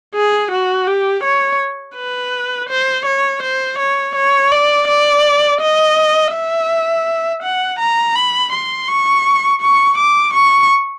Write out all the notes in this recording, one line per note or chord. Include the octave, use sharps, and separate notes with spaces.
G#4
F#4
G4
C#5
B4
C5
C#5
C5
C#5
C#5
D5
D5
D#5
E5
F#5
A#5
B5
C6
C#6
C#6
D6
C#6